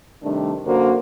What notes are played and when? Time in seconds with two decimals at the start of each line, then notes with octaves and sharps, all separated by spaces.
0.23 C3 D#3 G3 A3 D4
0.66 F#2 D3 A#3 F#4 A#4 C5